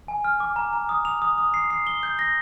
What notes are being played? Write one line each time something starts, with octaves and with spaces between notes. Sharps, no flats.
G#5
F6
D6
A#5
A#5
D#6
F7
D#6
D#6
C7
C7
G7
G6
A#6